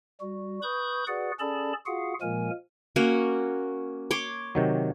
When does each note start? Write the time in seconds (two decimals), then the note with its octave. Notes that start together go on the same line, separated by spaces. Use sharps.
0.21 G3 F#4
0.63 B4 B5 C#6 D#6 G6
1.07 F#4 G#4 B4 D5 F#5
1.40 C#4 G#4 A4 D5 A5 B5
1.86 F4 F#4 G#4 F5 F#5
2.22 A#2 F3 G#3 A#3 A#4 G#5
2.96 A#3 C#4 F#4
4.11 C#5 C6 D6
4.55 C3 D#3 F#3